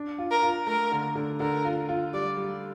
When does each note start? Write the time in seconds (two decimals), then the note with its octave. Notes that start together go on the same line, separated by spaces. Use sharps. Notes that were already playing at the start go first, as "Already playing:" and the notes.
Already playing: D4
0.18 F4
0.31 A#4
0.42 F4
0.67 A3 A#4
0.92 D3
1.15 D3
1.40 D3 A#4
1.65 F4
1.89 F4
2.14 G3 D5
2.37 G3